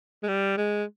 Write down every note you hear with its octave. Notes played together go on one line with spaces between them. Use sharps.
G#3
G3
G#3